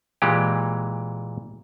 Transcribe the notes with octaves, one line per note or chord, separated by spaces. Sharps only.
A#2 E3 G#3 G4